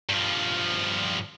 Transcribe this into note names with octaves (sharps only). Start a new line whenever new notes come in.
G2 F3